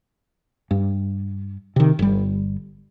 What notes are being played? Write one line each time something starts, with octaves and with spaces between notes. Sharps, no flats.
G2
C3 D#3
G1 G3